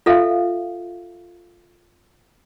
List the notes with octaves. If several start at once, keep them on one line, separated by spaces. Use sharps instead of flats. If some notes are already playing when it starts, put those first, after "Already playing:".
F4 A4 E5 F5